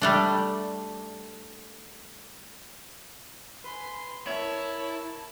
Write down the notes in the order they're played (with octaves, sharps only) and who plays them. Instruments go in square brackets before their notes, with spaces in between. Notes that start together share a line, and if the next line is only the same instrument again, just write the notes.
[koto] G3 A3 D4
[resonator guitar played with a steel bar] B4 [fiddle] G#5 C6
[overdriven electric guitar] E4 [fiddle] A#4 A5 [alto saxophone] C#5